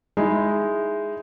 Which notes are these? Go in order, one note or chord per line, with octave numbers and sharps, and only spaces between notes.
G#3 D#4 E4